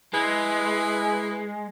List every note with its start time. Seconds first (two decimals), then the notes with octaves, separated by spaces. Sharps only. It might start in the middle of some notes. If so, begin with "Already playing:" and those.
0.13 G#3 E4 G#4 B4